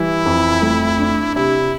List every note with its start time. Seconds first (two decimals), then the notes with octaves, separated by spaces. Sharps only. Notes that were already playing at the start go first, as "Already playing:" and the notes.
Already playing: E3 G3 E4
0.26 F2
0.62 A3
0.99 D4
1.35 C3 E4